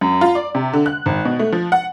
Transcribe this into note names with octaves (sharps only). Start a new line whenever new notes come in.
F#2
F4
D5
C3
D3
F#6
G#1
B2
A3
F3
F#5